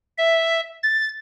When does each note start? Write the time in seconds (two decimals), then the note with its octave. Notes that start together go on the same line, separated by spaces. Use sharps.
0.18 E5
0.83 A6